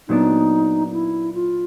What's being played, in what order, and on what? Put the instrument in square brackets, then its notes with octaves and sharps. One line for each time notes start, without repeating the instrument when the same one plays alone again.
[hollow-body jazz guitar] A#2 F#3 B3 D4 [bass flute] D#4
[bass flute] E4
F4